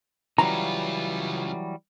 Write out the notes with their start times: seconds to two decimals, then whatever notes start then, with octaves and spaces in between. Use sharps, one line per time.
0.38 C#3 E3 F#3 G3 F4 A#5